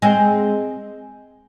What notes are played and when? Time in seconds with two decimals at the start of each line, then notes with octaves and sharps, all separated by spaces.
0.02 G#3 C4